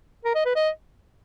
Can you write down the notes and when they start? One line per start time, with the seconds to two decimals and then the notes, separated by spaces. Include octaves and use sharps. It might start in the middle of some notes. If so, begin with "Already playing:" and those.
0.25 A#4
0.35 D#5
0.45 B4
0.56 D#5